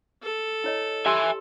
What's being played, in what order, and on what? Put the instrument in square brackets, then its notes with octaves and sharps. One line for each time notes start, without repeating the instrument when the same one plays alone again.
[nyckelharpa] A4
[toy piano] E4 C#5 D#5
[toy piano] G4 C6 E6 [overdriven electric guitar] E5 G#5